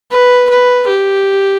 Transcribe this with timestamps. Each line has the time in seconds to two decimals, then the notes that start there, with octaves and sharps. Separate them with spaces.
0.12 B4
0.50 B4
0.88 G4